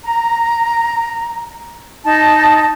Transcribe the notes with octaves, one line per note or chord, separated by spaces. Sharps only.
A#5
D#4 A5